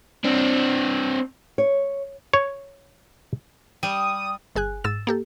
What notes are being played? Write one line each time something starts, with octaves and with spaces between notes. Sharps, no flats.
C4 D4
C#5
C#5
G3 D#6
G1 G#4 G#5 F#6
G#2 E6 A6 E7
A#3 G4 A4